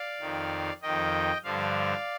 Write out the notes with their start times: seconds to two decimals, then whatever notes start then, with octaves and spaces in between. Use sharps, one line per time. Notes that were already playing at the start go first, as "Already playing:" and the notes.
Already playing: D5 F5
0.20 F2 D#3
0.82 F2 D#3 D#5 G5
1.44 G2 D3 F3 D5 F5